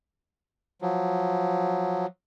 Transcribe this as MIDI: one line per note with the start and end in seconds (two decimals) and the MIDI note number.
0.82 2.06 53
0.82 2.06 54